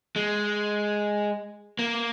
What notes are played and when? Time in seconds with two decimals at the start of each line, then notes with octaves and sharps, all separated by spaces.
0.16 G#3
1.79 A#3